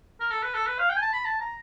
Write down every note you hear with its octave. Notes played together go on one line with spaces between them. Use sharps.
A#4
A4
B4
A4
B4
F5
G5
G#5
A5
B5
A5
A#5